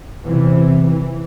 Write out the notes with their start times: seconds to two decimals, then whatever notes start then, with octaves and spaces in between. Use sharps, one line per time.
0.24 E2 C3 E3
0.84 E3